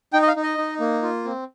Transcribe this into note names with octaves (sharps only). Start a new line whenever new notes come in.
D#4 G5
D#5
F5
D#4
D#5
D#4
A#3
F4
C4